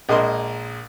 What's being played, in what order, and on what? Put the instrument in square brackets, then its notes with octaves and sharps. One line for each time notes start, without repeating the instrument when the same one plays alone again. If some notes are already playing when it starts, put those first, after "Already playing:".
[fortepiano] A#1 G#3 A#3 D#5 C6